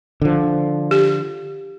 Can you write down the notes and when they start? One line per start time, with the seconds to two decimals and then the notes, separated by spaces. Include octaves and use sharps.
0.22 D3 F3
0.91 G4